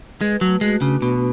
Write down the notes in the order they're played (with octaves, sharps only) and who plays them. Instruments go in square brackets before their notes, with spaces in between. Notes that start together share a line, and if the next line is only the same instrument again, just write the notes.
[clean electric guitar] G#3 [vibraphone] B4
[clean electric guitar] F#3 [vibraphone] A3
[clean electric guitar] G#3 [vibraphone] F#4
[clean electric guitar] C#3 [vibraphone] D4
[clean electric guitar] B2 [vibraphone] B4